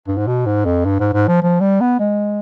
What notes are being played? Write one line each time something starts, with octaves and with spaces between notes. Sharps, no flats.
G2
G#2
B2
G#2
F2
G2
G#2
G#2
F3
F3
G3
B3
G#3